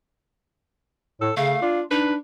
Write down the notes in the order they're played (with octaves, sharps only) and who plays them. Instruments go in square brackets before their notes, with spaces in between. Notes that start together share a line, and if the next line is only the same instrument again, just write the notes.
[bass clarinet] A2 [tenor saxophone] A4
[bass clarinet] C#3 [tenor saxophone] A3 [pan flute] F5
[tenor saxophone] D4 [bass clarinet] F4
[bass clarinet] D4 [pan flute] D#4 [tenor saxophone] B4